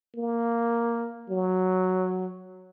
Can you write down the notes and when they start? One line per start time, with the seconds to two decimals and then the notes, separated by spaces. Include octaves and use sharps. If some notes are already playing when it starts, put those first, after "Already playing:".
0.16 A#3
1.30 F#3